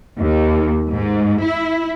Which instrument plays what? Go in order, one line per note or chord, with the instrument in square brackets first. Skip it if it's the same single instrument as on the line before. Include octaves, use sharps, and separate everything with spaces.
[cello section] D#2
G#2
E4